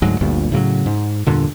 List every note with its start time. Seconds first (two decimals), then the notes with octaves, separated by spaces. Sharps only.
0.02 D2 G#2 F#3 G#3
0.21 G1 D2 G2 A#2
0.52 A2 C#3 E3 F#3
0.86 G#2
1.27 E2 G2 A#2 D3